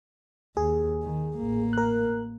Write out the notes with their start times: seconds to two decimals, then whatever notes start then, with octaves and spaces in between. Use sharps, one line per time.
0.57 D#2 G#4
1.03 D#3
1.38 A1 A#3
1.73 A#4 F#6